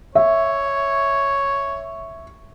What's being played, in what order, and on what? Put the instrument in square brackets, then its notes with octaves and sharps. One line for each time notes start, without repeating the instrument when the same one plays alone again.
[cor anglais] C#5 [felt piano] E5